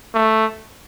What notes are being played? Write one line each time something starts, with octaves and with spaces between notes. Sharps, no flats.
A3